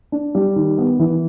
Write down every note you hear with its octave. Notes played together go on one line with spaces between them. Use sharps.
D4
G3
D#3
B3
E3